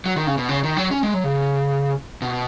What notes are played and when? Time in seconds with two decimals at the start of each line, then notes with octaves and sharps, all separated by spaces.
0.06 F#3
0.16 D#3
0.27 C#3
0.38 B2
0.49 C#3
0.63 D#3
0.77 F#3
0.91 C#4
1.03 G#3
1.14 F#3
1.24 C#3
2.22 B2